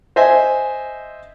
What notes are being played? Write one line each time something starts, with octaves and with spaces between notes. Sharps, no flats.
C5 D#5 E5 G#5